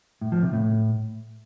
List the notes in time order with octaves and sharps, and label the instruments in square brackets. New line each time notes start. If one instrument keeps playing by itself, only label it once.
[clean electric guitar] A2
F3
C3
A2